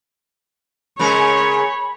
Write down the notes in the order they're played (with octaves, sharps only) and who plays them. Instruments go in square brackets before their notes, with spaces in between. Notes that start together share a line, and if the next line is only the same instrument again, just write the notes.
[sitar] C#3 G#3 A#4 [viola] C#5 [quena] B5